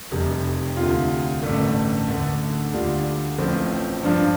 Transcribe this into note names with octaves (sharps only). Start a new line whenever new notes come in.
F1 F2 C3 G3
D2 C3 G3 F4
A1 G2 D3 A3
D2 D3 A3
D2 D3 G3 D4 F4
A1 A2 F3 C4 F4
G2 F3 D4 F4